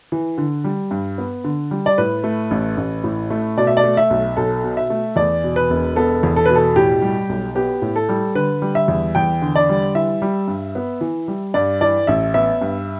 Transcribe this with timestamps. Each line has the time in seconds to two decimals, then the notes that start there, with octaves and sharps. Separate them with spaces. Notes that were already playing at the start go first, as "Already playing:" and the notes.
0.12 E3
0.38 D3
0.64 G3
0.91 G2
1.18 B3
1.44 D3
1.71 G3
1.86 D5
1.98 A2 B4
2.24 A3
2.51 A1
2.77 A1
3.04 A2
3.30 A3
3.57 B2 D5
3.67 E5
3.77 D5
3.84 A3
3.97 E5
4.10 B1
4.37 B1 A4
4.64 B2
4.77 E5
4.90 A3
5.16 E2 D5
5.44 B2
5.56 B4
5.70 E1
5.96 B3 A4
6.23 E2
6.36 A4
6.46 B2 B4
6.55 A4
6.76 A2 G4
7.02 G3
7.29 B1
7.55 B3 G4
7.82 A2
7.96 A4
8.09 G3
8.35 D3 B4
8.62 G3
8.75 E5
8.88 E2
9.15 E2 G5
9.42 D3
9.56 D5
9.69 G3
9.95 E3 E5
10.22 G3
10.48 G2
10.75 B3
11.01 E3
11.28 G3
11.54 G2 D5
11.81 E3 D5
12.07 A1 E5
12.34 B3 E5
12.61 G2